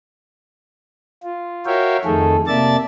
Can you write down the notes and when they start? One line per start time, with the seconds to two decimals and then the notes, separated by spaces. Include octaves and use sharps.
1.23 F4
1.66 F#4 A#4 C#5 E5 F5 G5
2.05 F2 D#3 A3 G#4 A4
2.47 C3 A#3 D5 E5 A5 A6